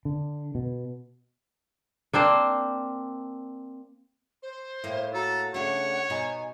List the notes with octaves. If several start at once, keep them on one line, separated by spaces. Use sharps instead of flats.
D3
B2
A#3 C4 D4 C5
C5
A2 A#3 E4
F#4 A4 A#5
C#3 A3 D4 C#5 F#5
B2 D#4 G#5